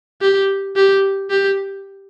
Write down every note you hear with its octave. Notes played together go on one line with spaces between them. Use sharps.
G4
G4
G4